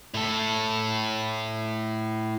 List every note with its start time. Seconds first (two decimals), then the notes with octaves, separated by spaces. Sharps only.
0.14 A2 A4